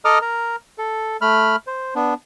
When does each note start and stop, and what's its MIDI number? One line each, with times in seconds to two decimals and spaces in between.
0.05 0.19 69
0.05 0.19 75
0.05 0.19 82
0.05 0.19 86
0.05 0.19 87
0.05 0.19 89
0.21 0.56 70
0.21 0.56 82
0.78 1.17 69
1.21 1.56 57
1.21 1.56 83
1.21 1.56 89
1.67 1.94 72
1.95 2.14 59
1.95 2.14 62